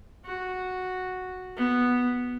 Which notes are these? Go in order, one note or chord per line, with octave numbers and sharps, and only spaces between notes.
F#4
B3